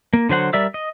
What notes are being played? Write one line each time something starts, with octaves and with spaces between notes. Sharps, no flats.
A#3
D3 F#3 C5 F#5
G3 A#4 D5 E5 E6
D#5